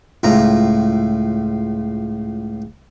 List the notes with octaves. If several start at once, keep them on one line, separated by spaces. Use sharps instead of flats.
C#2 A2 F4 A#5